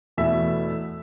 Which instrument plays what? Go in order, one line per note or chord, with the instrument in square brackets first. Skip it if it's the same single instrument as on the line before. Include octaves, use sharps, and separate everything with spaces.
[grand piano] E2 B2 A3 E4 E5